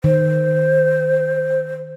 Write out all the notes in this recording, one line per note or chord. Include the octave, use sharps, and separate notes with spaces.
D#3 C5